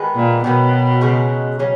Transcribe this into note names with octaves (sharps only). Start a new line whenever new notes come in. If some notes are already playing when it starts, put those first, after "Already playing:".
Already playing: D#3 G#3 B3
A#2
B2 D#3 F#3 B3
C#3 G#3 D#4 F#4
C#3 F#3 C#4